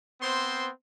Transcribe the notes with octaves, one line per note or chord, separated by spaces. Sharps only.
B3 C4 C5 C6